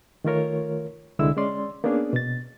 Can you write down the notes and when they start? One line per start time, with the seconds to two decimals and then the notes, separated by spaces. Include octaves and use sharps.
0.24 D#3 A3 F4 A#4 C#5
1.19 C2 D3 G#3 E4 E6
1.37 G#3 C#4 D5 C6
1.84 A#3 B3 C#4 D4 G#4
2.13 B2 A6